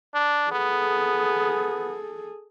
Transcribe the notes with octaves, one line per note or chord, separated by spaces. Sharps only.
D4
B3 G#4 A4